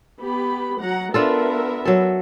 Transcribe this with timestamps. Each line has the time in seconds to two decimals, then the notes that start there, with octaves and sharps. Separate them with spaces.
0.21 B3 G4 B5
0.81 F#3 F#5 A#5
1.14 B3 D4 F4 A4 A#4 E5
1.85 F#3 A4